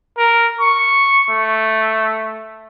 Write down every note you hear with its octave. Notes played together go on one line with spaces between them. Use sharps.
A#4
C#6
A3